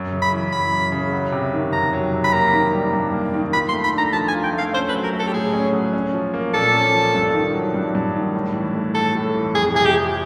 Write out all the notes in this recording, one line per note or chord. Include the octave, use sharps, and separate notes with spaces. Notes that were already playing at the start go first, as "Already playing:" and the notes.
Already playing: F#2
C#3
B5
E3
F#2 B5
F#2
C#3
F#3
C3
D#3
F2 A#5
F#3
C3
B5
A#3 A#5
D#3
G3
G2
A#3
D#3
F4 B5
C6
A3
B5
D4 A#5
F3 A5
G#5
F4
G5
A3
F5
C#4 C5
B4
F#3
A#4
A3
A4
G4
A2 G#4
C#4
F#3
C#4
F3
A#3
A#2 A4
C#4
F3
G2
D#3
F#3
G2
G2
D#3
A2
E3
A3
A2 A4
A2
E3
F2 G#4
C3 G#4
G4
F3